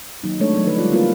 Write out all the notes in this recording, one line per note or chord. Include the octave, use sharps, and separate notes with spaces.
D#3 F#3 A#3 D#4
G#3 A3 C4 D4 A4 C#5
F#3 A3 B3 D#4
D3 F3 F#3 A3 D#4 B4
G3 G#3 D#4 F4 A4 D5
A#3 C4 E4 F4 A#4 B4